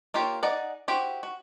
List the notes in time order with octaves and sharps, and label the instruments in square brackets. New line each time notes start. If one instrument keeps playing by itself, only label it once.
[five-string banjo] A#3 F4 G4 C#5
D#4 G#4 D5 F#5
E4 F#4 G4 C5
F#4